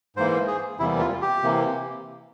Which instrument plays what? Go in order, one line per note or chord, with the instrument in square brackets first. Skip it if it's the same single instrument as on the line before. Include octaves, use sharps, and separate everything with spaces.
[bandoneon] G#2 E3 A#3 C5
G#4
E2 C3 E3 G3 A#3 E4
F4
G4
C3 E3 A#3